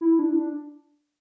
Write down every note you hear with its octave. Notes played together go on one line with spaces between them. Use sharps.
E4
D4
E4
D4